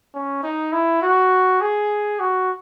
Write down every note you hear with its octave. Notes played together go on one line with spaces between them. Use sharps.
C#4
D#4
E4
F#4
G#4
F#4